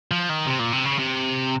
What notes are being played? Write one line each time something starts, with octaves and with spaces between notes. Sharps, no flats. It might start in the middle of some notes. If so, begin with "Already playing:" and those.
F3
D#3
C3
A#2
C3
C#3
C3